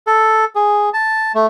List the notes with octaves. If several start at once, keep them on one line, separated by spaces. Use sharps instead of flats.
A4
G#4
A5
A3